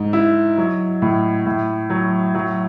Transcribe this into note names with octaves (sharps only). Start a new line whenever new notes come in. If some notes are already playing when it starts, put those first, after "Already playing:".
Already playing: G#2
E4
F#3
A2
A2
F#3
F#3